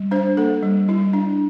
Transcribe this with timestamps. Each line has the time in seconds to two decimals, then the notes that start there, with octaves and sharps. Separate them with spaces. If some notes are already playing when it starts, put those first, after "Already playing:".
Already playing: G3
0.11 D4 C5
0.37 A#3 A4
0.62 G3
0.88 G3 E4
1.13 D4